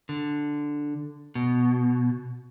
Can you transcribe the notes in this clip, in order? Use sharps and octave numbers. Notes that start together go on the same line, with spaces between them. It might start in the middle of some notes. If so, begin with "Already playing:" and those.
D3
B2